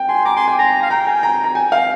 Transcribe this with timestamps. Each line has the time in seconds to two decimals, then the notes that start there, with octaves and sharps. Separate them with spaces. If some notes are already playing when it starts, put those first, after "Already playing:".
Already playing: G5
0.09 G#5 C6
0.25 A#5 D6
0.37 G#5 C6
0.48 G5
0.59 G#5 A#5
0.82 F5
0.90 G5 A#5
1.07 G#5
1.23 A#5
1.44 A#5
1.55 G5 G#5
1.72 F5